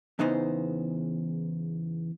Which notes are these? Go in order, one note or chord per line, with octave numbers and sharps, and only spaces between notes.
E2 C#3 E3 B3 D#4 C5